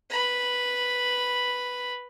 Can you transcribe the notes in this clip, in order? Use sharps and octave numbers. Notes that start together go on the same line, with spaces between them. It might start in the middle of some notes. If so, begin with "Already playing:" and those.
B4 B5